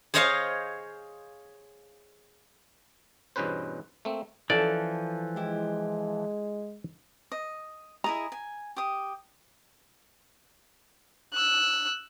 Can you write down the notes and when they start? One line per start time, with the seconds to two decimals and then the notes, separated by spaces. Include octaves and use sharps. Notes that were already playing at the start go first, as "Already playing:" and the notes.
0.14 G#4 C5 C#5 D#5 F5
3.36 E2 G2 B2 C#4 B4 C5
4.05 A3 A#3 C4
4.50 E3 F3 C#4 A4 D5
5.36 G#3 E4 G4
7.32 D#5
8.04 E4 G#4 D#5 A#5
8.32 G#5
8.76 G4 D#6
11.34 E6 F#6